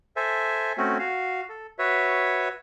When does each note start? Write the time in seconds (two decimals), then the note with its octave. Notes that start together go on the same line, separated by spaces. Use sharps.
0.16 A4 C5 E5 G#5
0.78 A3 C4 C#4 F#4
0.99 F#4 F5
1.49 A4
1.79 F#4 B4 C#5 E5